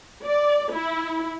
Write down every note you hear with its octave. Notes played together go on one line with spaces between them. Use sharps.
D5
E4